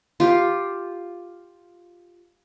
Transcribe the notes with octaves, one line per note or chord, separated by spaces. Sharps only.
F4 G4